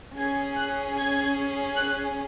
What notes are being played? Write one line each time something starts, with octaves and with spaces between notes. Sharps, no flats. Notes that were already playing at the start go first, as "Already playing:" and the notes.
C#4 G#4 G#6
F#6
G#6
F#6